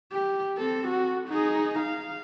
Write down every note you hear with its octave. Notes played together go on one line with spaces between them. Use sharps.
G4
C4 A4
F#4
D#4 G#4
F5